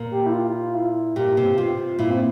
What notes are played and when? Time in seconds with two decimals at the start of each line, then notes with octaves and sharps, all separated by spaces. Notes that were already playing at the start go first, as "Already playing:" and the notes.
Already playing: A#2
0.11 G4
0.26 E4
0.32 F4
0.74 E4
1.16 A#2 G4
1.37 C3
1.58 C3 F4
1.99 A#2 E4
2.10 C4